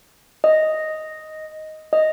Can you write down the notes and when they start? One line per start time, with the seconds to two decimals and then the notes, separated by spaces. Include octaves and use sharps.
0.44 D#5
1.93 D#5